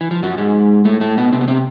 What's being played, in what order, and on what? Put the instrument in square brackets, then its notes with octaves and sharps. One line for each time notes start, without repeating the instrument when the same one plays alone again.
[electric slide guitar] E3
F3
F#2 F#3
G#2 G#3
A2 A3
A2 A3
B2 B3
C3 C4
B3
C3 C4